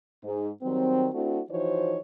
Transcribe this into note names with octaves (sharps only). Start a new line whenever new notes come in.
G#2
D#3 F#3 G3 C4
A3 C4 D4 E4 F#4
E3 F3 D#4 F#4 C5 C#5